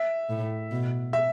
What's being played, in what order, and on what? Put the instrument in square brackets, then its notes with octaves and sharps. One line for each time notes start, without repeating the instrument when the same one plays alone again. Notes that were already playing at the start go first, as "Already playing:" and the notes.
Already playing: [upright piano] E5
[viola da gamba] A2
B2
[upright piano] E5